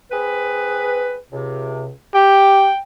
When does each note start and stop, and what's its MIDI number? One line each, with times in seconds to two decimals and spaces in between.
0.12 1.18 60
0.12 1.18 68
0.12 1.18 71
1.32 1.92 37
1.32 1.92 48
2.15 2.71 67
2.15 2.78 79